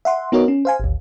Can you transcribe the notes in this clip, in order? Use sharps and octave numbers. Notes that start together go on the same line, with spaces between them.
E5 F#5 C6
B3 D#4 F#4 A#4 C#5 D#5
C#4
C5 F5 G#5
G#1 D2